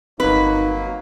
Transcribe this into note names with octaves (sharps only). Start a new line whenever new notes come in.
G1 F#3 A#3 C4 D#4 B4